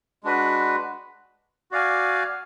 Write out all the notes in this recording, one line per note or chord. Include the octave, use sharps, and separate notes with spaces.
G#3 D4 F#4 B4
F#4 D5 F5 G#5